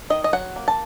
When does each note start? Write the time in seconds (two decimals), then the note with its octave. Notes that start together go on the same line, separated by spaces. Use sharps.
0.10 D#3 D#5
0.24 D#5
0.33 F#3 F#5
0.56 A#3
0.68 A5